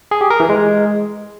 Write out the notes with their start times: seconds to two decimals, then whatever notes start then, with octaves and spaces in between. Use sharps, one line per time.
0.11 G#4
0.21 G4
0.30 A#4
0.40 E3
0.49 G#3